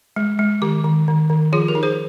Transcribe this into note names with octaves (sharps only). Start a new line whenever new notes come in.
G#3
G#3
D#3 G4
D#3
D#3
D#3
F3 F4 G#4
G4 A#4
D#4
G#4 C5